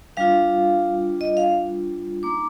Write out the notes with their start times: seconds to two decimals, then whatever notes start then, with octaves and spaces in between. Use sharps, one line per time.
0.17 G3 D4 F4 F5
1.21 D#5
1.37 F5
2.23 A#3 D#4 D6